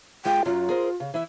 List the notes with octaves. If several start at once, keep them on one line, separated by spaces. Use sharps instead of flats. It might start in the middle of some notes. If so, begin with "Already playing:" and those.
G#3 F4 G#4 G5
F#2 F#3 F4
G#4 A#4 C5
C#3
E3 E4 E5